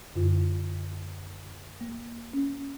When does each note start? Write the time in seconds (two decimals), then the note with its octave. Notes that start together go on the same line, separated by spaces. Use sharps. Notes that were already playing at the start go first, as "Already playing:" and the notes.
0.15 F#2 D3 F4
1.81 A#3
2.33 C#4